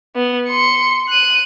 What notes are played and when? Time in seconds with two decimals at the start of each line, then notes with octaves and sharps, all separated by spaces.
0.16 B3
0.49 C6 C#7
1.09 F#6 D#7